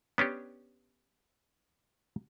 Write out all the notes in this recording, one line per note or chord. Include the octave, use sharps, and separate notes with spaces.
B3 C#4 D4 G4